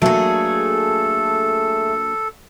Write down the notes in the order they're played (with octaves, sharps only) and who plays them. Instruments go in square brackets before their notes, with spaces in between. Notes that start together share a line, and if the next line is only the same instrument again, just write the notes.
[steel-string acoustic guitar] F#3 A#3 D4 [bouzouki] A3 G#4 [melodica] A4